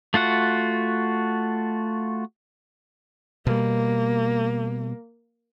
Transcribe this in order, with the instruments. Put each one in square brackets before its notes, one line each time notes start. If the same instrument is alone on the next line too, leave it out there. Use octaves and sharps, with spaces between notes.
[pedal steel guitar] A3 F4 F#4 F#5
[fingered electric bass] B2 G3 [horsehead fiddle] A#3